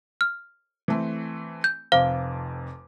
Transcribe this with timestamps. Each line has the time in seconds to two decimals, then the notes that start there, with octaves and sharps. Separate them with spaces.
0.21 F6
0.88 E3 A3 C4
1.64 G6
1.92 F1 F2 C5 F5 D6